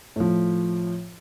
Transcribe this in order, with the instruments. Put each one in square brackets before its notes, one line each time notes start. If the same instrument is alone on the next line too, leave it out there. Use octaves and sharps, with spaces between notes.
[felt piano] A2 F3